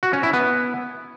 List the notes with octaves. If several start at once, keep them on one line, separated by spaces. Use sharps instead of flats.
F#4
C#4
E4
B3